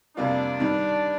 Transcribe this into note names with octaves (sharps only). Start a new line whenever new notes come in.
F2 C3 G3 A#3 D4 F4
G2 D#3 G3